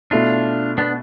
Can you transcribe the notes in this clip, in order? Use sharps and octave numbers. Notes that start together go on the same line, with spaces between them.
B2 A3 D4 E4 F4
B3 D4